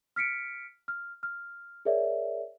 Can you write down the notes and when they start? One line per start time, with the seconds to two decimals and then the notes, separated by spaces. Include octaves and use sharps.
0.16 F6 B6 C#7 D7
0.88 F6
1.23 F6
1.85 G#4 A#4 C#5 D5 E5